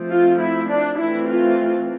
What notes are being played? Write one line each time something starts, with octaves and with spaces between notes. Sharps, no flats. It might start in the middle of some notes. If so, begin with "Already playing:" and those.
Already playing: F3 A3 C4
F4
E4
D4
E3 A3 C4 E4
F4